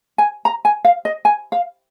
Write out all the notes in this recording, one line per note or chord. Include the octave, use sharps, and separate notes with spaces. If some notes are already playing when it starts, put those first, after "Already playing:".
G#5
A#5
G#5
F5
D#5
G#5
F5